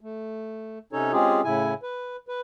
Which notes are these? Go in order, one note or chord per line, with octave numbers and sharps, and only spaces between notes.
A3
C3 C#4 D#4 A4 C#5
G#3 C4 C#4 F4 G4 G#4
A2 C#3 E4 G#5
B4
B4